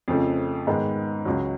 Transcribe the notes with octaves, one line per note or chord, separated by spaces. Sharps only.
F2 C#3 F3 A3
G#2 D#3 G#3 B3
C#2 C#3 F#3